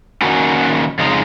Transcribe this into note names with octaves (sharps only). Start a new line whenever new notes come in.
D#3 F#3 A#3 C#4 F#4
F2 C#3 G#3 D#4